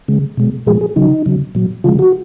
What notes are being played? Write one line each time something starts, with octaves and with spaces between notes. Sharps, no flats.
C#3 G#3
B2 G#3
A#2 F3 G#3 G#4
G#4
C#3 F#3 D#4
C#3 F#3
A#2 F#3
C#3 F3 G#3 F4
F#4